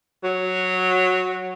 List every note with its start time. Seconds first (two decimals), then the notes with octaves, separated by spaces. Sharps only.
0.24 F#3